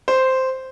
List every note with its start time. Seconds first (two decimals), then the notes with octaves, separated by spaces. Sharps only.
0.08 C5